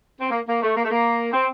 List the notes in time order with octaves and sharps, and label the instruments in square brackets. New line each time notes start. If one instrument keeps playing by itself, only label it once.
[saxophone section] C4
A#3
A#3
A3
A#3
A3
A#3
C4